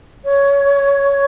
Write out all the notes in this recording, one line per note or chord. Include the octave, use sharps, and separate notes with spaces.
C#5